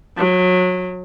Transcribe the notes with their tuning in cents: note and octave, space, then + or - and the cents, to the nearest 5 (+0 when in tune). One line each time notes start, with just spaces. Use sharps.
F#3 -25